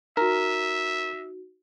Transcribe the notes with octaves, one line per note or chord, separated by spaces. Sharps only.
D#4 F#4 A#4 E5